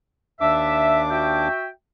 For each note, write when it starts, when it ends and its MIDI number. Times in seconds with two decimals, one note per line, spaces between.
0.41 1.48 39
0.41 1.48 62
0.41 1.02 76
0.41 1.48 86
1.10 1.69 66
1.10 1.69 76
1.10 1.69 79